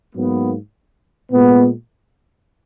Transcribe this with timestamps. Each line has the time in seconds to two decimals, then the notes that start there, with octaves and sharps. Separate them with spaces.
0.15 G#2 F#3 A#3 B3
1.31 A#2 G#3 B3